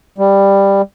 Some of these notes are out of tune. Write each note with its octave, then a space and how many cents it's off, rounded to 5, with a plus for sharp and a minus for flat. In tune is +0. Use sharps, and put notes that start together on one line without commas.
G3 +10